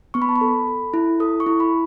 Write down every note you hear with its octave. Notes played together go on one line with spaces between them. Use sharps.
B3 C#6
B5
A5
B5
A4
A4
E4
A4 D#6
C#6
E4
B5